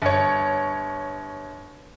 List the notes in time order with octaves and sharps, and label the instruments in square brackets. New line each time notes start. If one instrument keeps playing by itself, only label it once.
[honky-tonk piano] G1 C#5